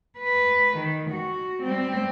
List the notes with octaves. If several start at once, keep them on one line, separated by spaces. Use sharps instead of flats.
B4
D#3
F#4
G3 C4